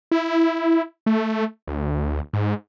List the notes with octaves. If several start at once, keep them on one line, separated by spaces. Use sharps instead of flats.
E4
A3
D2
G#2